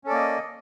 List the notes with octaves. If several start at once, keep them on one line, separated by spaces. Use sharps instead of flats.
A#3 C#4 A4 D5 D#5